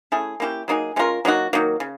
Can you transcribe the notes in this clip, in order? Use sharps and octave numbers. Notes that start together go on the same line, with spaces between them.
A3 C#4 E4 G#4
A#3 C#4 E4 G4
F#3 A#3 D#4 G#4
G#3 C#4 F4 A#4
F#3 A#3 D#4 F#4
D#3 F#3 A#3
C#3